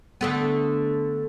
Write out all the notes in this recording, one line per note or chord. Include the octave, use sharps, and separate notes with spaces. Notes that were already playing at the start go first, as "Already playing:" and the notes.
D3 A3 B3